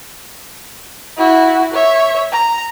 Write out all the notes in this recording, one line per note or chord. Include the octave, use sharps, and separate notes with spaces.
E4 F#4
C#5 E5
A#5